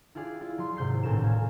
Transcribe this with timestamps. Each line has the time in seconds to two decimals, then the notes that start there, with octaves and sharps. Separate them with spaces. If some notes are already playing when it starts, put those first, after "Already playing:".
0.15 E4 F4 G4 G#4 D5
0.41 E4 F4
0.58 F#3 C6
0.77 D#2 G#2 C3 G6 C7
1.03 D#1 A1 A2 A#4 E7
1.23 F5 G#5